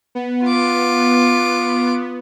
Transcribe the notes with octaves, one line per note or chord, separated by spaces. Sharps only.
B3
F4 D6